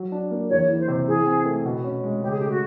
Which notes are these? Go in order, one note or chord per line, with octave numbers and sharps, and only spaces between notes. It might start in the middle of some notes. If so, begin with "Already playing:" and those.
Already playing: F#3
D4
A#3
E2 C#5
E3
C5
C3
E3 G#4
C4
A3
B2
C#4
G#3
C#3 G4
G#4
A3 G4
F#4